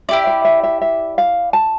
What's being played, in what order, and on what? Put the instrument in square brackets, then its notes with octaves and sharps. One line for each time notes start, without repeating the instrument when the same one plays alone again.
[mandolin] E4 G4 D5 [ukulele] E5
[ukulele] E5
E5
E5
E5
F5
A5